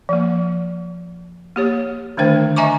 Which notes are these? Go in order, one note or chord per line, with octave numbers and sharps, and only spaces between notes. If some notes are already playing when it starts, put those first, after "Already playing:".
F3 A#3
A#3 G4 C#5
D3 D#3 A3 D4 C5 G5
D#5 E5 G#5 A#5 C#6 D6